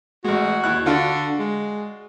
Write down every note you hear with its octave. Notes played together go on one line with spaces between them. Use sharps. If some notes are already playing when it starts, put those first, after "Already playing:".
A1 G#3 F#4
D#2 E4 F#6
D3 F4 F#4 D5
G#3